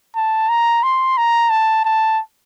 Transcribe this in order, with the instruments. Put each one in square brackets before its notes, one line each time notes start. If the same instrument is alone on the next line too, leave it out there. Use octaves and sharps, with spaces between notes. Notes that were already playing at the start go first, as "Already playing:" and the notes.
[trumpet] A5
A#5
C6
A#5
A5
A5